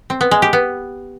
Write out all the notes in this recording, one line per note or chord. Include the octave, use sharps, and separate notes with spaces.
C4
B3
G#3
G4
B3